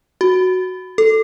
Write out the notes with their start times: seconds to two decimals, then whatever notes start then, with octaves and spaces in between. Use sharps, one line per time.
0.21 F#4
0.98 A4